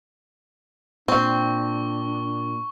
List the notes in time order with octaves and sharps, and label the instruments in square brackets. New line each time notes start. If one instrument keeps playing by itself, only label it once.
[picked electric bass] A#2 [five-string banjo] C4 [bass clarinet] D4 [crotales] C#6 G7